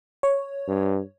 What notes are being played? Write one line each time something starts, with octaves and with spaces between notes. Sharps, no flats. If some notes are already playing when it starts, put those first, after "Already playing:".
C#5
G2